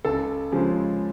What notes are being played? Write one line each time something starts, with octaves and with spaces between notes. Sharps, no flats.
C#2 A4
C#3 F3 G#3